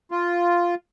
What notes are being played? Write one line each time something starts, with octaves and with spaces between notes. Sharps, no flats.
F4